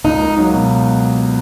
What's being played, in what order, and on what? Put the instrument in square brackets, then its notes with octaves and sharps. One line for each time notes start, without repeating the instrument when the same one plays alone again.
[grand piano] C#2 [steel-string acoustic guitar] D#4
[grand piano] A#3
F#3
B2